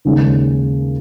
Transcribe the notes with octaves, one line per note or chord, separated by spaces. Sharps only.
D#2 C#3 G#3 C#4